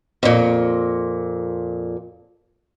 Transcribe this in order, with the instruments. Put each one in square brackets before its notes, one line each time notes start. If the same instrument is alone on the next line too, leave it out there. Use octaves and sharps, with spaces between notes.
[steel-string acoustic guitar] F2 A#2